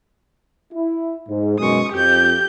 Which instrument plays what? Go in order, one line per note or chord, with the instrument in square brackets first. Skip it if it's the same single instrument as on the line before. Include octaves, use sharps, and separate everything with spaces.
[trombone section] E4
G#2
[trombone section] F#2 B2 G#3 [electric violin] C#6 D#6
[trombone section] F2 [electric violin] G4 G6